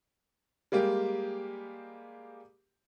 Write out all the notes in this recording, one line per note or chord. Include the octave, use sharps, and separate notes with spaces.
G3 G#3 A#3 G4